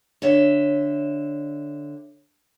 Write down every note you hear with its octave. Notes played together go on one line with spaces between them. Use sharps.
D3 C#5 E5